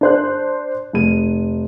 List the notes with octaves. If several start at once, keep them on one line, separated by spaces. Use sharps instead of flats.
D4 C5 F#6
F1 D#7